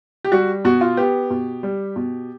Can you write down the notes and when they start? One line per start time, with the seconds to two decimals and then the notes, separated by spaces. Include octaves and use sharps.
0.24 G4
0.32 G3 F#4
0.65 B2 F#4
0.81 F4
0.97 B3 G4
1.30 B2
1.63 G3
1.96 B2